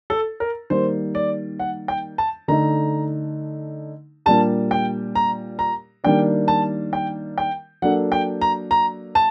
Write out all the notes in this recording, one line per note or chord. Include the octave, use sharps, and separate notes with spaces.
A4
A#4
D#3 G3 A#3 C5
D5
F#5
G5
A5
D3 A3 D#4 A#5
A#2 G3 A#3 D4 G4 A5
G5
A#5
A#5
D#3 G3 A#3 D4 G5
A5
G5
G5
F#3 A#3 D4 A4 F#5
G5
A#5
A#5
A5